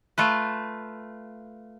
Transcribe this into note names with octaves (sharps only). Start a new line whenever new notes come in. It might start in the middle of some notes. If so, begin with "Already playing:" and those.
A3 F4 B4